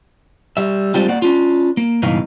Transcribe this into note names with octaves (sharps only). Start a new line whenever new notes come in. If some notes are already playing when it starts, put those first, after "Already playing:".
G3 E5
G3 G#3 C4 D4 F4 G4
A#3 D5 F#5
C#4 D4 F4
A#3
C#2 G2 B2 E3 D#4 F5